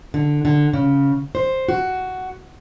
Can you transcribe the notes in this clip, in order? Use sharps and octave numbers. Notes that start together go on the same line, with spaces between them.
D3
D3
C#3
C5
F#4